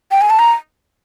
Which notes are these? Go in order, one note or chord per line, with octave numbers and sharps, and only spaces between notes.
G5
G#5
A5
A#5